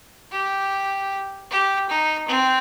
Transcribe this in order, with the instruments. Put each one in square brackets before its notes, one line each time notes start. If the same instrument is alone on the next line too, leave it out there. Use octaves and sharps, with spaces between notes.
[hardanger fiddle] G4
G4
D#4
C4